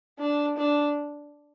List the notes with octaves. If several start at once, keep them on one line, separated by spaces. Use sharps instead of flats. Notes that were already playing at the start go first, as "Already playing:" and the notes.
D4
D4